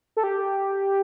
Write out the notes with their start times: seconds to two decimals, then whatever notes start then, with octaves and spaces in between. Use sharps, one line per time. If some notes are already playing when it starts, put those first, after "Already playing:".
0.17 A4
0.24 G4